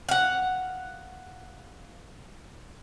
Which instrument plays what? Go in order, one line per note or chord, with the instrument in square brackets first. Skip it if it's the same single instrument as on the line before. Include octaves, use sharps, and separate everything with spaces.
[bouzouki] F5 F#5